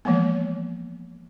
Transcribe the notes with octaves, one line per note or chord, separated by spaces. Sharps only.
E3 F3 G#3 A#3 B3